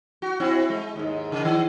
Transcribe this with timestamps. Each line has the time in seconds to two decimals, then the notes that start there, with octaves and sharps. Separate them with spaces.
0.22 F#4
0.40 C4 E4 F#4
0.70 G#3
0.96 D#2 G#2
1.32 C#3
1.45 D#3